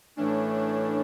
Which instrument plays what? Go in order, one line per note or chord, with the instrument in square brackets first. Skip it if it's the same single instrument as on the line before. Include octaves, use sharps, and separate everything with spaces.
[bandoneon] A2 E3 A3 C#4 [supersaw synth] D4
[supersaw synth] D4